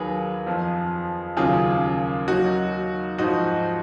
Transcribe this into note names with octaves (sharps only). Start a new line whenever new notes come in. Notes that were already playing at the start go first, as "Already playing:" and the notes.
Already playing: D#2 D#3 F#3 G#4 B4
F2 F3
D#2 C#3 F#3 F4 G#4
D#2 D#3 F#3 D#4 F#4
G#2 F3 D#4 F#4